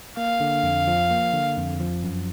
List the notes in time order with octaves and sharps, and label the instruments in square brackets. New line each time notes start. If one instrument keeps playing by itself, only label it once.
[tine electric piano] A#3 [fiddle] F5
[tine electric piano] D3
F2
F3
A#3
D3
F2
F3
F#2